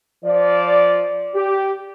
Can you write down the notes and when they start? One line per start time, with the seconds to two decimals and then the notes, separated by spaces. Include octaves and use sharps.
0.24 F3 D5
1.35 G4